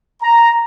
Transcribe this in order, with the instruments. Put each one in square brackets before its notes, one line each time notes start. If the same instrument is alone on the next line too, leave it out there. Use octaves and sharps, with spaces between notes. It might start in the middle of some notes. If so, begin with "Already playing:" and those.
[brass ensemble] A#5